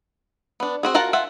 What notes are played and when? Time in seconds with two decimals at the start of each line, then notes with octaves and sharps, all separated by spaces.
0.60 B3 D4
0.83 C4 F#4 G#4
0.94 F4 F#4 A#4 F#5 A5
1.13 F4 E5 F#5 G#5